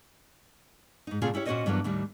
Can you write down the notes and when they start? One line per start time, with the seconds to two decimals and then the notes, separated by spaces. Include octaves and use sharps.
1.07 G#2 D#4
1.22 A#2 C#3 A3 C4 F4 G#4
1.34 C#4 E4 G4 C#5
1.46 A#2 C#4 F#4 C5 C#5 D#5
1.66 G2 E3 F#3 A#3 B3
1.84 D#2 A2 D#3 G3